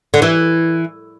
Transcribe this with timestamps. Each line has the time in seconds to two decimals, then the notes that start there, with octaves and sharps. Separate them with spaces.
0.14 D3
0.22 E3